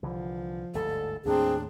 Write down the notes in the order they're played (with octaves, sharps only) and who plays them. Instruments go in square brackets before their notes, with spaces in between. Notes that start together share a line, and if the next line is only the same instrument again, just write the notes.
[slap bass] C2 D3 E3 [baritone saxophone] F3
[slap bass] G1 D2 G#2 [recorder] A4
[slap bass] D#2 A2 A#3 [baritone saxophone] C4 [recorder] D4 [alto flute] G#4